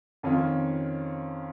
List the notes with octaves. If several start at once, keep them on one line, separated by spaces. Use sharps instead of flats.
F2 D#3 C#4 F4